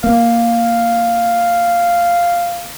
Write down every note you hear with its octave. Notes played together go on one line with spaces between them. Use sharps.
A#3 F5